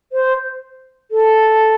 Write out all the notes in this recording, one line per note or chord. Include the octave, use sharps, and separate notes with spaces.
C5
A4